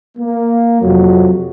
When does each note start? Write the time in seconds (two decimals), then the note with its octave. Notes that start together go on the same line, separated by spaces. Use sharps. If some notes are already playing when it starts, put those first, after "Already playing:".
0.18 A#3
0.82 F2 C3 F3 F#3